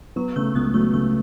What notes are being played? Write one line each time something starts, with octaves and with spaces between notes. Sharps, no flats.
F#3 B3
C#3 A3
C#2 B3
F#3 A3
C#3 A3